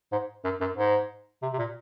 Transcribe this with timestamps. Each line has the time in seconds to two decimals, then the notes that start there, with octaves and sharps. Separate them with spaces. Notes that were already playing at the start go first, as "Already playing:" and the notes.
0.12 G#2
0.44 F#2
0.61 F#2
0.76 G#2
1.42 C3
1.53 C3
1.59 A#2